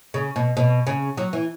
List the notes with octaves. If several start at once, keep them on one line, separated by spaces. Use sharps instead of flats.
C#3
B2
B2
C#3
F#3
E3